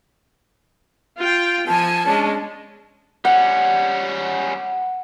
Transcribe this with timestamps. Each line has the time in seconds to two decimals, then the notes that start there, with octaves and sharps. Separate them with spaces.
1.18 F4 G5
1.68 F3 G#5 A5
2.05 G#3 C#4 D4
3.25 G3 C#4 F#5